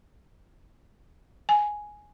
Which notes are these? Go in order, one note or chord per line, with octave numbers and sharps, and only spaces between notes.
G#5